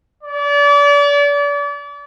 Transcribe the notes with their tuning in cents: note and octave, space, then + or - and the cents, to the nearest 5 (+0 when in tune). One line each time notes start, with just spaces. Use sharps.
D5 -35